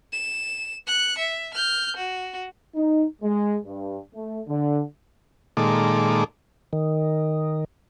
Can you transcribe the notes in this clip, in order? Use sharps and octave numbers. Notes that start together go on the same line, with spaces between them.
E7
F#6 C#7
E5
F6 G6
F#4
D#4
G#3
G2
A3
D3
A#2 D#3 G#3 A4 D6
D#3